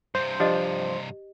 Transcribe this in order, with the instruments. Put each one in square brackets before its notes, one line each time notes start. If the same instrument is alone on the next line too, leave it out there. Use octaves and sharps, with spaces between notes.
[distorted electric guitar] G2 C3 [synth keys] C5
[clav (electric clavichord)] F3 D4 [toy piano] G4 D#5